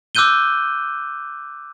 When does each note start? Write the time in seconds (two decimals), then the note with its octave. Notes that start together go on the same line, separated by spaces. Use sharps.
0.15 D6 E6 F#6 G6 D#7 G7